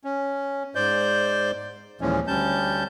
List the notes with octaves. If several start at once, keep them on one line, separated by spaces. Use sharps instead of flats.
C#4
G#2 C5 D5 G6
D#2 A#2 E3 F3 G#3 C#4
D2 G3 C#4 A5 G6